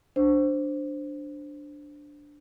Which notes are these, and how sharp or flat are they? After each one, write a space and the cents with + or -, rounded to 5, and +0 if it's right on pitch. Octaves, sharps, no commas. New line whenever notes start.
D4 +0 C5 +0